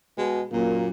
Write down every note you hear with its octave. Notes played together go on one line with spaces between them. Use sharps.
B2 G#3
F#2 A#2 A#3